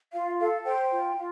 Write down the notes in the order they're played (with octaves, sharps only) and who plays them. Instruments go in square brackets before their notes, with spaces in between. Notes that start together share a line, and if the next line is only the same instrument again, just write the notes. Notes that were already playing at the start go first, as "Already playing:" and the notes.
[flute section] F4 [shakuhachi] F5
[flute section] A4 [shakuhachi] F5
[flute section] C5 [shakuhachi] G5
[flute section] F4
F4